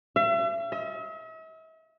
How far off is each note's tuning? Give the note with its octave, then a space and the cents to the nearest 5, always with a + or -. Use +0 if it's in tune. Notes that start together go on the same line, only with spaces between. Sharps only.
E5 +40
E5 -45